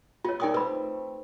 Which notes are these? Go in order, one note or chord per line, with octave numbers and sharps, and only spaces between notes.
B3 F4 C#5
D#4 E4 A#4 D5 G5 D#6
A3 C4 B4 B5